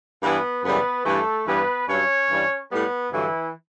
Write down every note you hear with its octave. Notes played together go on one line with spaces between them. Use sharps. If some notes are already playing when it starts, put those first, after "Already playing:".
G2 E3 G3 B3 B4
F#2 C#3 E3 G3 B3 B4
G2 E3 G3 A3 A4
G2 E3 G3 B3 B4
G2 F#3 C#4 C#5
G2 E3 G3
A2 G3 B3 B4
G2 D3 E3 F#3 E4